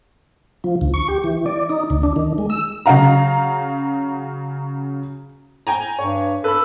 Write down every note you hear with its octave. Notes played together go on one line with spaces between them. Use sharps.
F3
D2
C#6
G4
E3
D5
D#4
D2
D4
D#3
G#3
E6
C#3 F#3 F5 A#5
G5 G#5 A#5
G2 C#5
A4 B4 B5